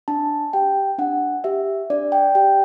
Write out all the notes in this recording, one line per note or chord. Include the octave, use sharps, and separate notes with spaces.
D4 A5
G4 G5
D4 F#5
G4 E5
D4 D5
G5
G4 G5